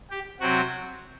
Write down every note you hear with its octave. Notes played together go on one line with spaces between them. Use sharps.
G4
C3 F#3 C4 F#4